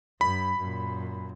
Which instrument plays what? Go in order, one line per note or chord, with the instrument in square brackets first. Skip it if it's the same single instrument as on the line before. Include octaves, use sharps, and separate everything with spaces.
[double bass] F#2 [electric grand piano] B5
[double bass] F#2 A#2